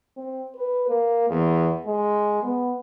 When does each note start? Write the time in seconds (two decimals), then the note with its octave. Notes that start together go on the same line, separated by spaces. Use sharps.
0.17 C4
0.55 B4
0.89 A#3
1.30 E2
1.86 G#3
2.43 B3